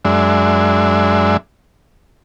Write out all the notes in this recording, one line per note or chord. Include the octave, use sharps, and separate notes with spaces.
F#2 G#3 D4 E5